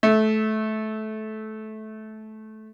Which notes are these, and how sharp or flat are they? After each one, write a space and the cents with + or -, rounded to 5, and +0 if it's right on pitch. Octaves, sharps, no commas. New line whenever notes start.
A3 -20